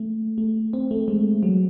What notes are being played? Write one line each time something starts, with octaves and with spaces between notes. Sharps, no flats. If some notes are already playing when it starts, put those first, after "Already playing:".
Already playing: A3
A3
C4
A3
G#3
F#3